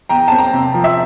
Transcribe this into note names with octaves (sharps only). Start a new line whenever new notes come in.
E2 G5 A#5
C4 A5
G5 A#5
C3
F3
E5